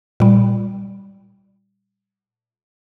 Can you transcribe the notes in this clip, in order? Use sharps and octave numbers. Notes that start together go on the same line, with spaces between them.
A#2 G3